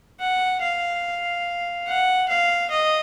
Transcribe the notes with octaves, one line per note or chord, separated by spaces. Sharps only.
F#5
F5
F#5
F5
D#5